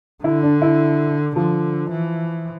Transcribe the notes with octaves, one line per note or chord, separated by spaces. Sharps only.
D3 E4
D4
E4
D3 F3
E3